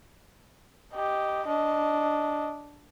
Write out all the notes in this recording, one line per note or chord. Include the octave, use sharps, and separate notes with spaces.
G4 D#5
D4 D#5